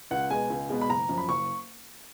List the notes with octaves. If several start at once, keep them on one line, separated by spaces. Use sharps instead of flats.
C#2 F#5
B2 G#3 B3 G#5
C#2
B2 G#3 B3
B5
F#1 A#5
F#2 F3
B5
F#1 C#6